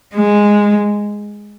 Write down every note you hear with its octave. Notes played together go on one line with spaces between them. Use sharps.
G#3